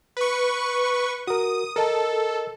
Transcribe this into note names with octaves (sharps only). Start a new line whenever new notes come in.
B4 C#6
F#4 A#4 D#6
A4 A#4 D#5 A5